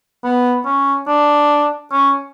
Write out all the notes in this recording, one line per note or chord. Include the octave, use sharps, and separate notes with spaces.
B3
C#4
D4
C#4